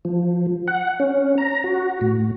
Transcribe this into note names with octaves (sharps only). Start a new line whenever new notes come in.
F3
F#5
C#4
A#5
F#4
A2